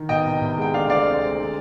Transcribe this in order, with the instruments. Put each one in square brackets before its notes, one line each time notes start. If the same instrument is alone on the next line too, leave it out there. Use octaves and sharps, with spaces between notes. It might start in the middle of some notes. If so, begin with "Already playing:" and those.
Already playing: [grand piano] D#3
B2 D#5 G5
C2
C2
G#3 G5
D3 D5 F5
D2 D5 F5
C4
G#3
D3